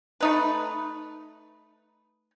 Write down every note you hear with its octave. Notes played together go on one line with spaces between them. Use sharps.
A3 D#4 B4